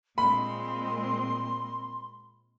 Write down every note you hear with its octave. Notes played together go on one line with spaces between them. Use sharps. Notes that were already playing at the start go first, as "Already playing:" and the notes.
A#2 G#3 C4 B5 C6